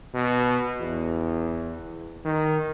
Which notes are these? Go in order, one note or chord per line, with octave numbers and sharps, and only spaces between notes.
B2
E2
D#3